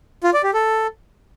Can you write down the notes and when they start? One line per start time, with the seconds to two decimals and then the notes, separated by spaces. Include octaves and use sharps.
0.24 F4
0.34 D5
0.44 G4
0.54 A4